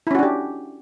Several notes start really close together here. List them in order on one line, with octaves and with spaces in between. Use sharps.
E4 C#4 F#4 D4 G4